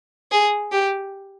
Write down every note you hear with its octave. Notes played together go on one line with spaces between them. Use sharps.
G#4
G4